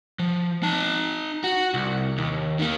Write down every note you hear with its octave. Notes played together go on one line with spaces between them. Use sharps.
F3
D#4 A5
F#4
C2
D#2
D#3 A#3